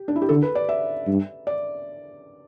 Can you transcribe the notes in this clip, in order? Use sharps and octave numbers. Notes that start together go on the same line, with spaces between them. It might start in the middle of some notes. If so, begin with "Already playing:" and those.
Already playing: G4
D4
E4
G4
D3 A4
B4
D5
E5
G2
D5